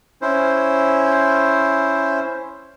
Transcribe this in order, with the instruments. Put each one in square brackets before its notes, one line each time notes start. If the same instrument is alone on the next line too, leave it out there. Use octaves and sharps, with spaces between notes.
[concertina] C#4 E4 C5